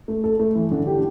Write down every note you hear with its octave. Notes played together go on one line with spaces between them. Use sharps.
A3
A4
A3
E3
D3
G4